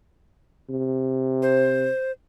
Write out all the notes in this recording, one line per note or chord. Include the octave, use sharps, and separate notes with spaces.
C3
C5